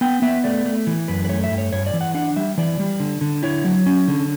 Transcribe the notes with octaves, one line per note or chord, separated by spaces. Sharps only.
B3 G5
B3 E5
A3 D5
A3
E3
F#2 B4
B4
A3 C#5
E5
G2
C#5
G2 C#5
D5
E3
F#5
D4 F#5
G3 E5
E3 D5
G3
D3
D3
E4 C#5
F#3
C#4
D3